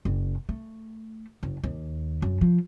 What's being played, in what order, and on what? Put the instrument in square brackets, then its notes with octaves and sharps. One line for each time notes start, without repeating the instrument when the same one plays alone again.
[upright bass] F#1
A3
F#1
D#2
F#2
F3